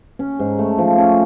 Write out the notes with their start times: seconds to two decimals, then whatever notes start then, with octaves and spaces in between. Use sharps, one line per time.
0.19 C#4
0.39 G#2
0.59 A3
0.78 F3
0.98 C#4